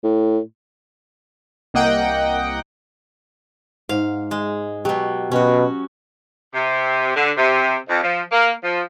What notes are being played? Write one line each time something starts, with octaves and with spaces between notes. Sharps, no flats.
A2
C2 A#3 D#5 F#5 G5
G#2 F5
G#3
B2 F#3 G4
B2 C#4 F#4
C3
D3
C3
F2
F3
A#3
F3